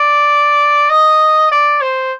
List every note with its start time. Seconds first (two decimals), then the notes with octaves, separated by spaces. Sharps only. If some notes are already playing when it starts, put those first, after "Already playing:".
Already playing: D5
0.90 D#5
1.51 D5
1.81 C5